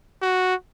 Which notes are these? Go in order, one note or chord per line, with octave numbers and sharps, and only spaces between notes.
F#4